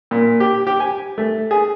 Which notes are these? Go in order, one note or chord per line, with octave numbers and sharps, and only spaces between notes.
A#2
G4
G4
G#5
A3
G#4